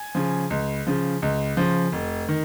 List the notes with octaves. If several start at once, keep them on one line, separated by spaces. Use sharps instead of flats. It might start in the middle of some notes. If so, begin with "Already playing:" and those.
Already playing: G#5
C#3 F3
C#2
C#3 F3
C#2
C#3 F3
F1
D#3